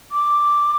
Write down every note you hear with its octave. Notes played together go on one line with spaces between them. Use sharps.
D6